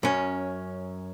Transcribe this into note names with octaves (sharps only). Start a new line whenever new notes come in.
F#2 C#4